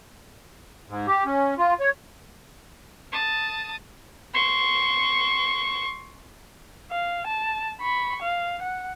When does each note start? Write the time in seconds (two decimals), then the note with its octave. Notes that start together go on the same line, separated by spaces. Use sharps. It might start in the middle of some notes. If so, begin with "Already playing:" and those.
0.88 G#2
1.08 G4
1.26 C#4
1.58 F4
1.80 C#5
3.12 A5 D#6
4.34 C6 C#6
6.91 F5
7.27 A5
7.81 B5 C#6
8.22 F5
8.62 F#5